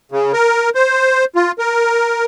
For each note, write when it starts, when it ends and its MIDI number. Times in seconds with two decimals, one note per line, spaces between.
0.12 0.32 49
0.33 0.70 70
0.75 1.25 72
1.36 1.51 65
1.59 2.25 70